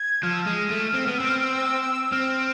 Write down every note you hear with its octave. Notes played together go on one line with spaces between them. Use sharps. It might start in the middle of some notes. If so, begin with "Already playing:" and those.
Already playing: G#6
F3 F6
E6
G#3 F6
A3
C4
B3
C4 E6
F6
F6
E6
C4 F6